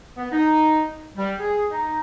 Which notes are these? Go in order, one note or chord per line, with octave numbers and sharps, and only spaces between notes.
B3
D#4
G3
G#4
D#4